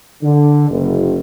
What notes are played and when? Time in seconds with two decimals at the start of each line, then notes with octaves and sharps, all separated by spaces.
0.23 D3
0.70 F#1